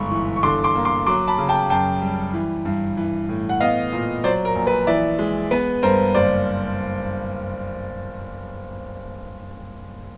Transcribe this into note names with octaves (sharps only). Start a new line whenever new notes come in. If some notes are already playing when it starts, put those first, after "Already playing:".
Already playing: G1 G#2 B5 C#6
E3
C#6
D3 C6 D6
C6 D6
A#3
C6 D6
F#3 C6 D6
A5 B5
C#3
G5 A5
F#2 G5 A5
G3
E3
G2
E3
A2
F#5
B3 D#5 F5
A#2
F#3 C5 D5
A#4
A#1
B4
E3 D5 E5
G#3
B3 B4
G2 A#4 C5
F#1 C5 D5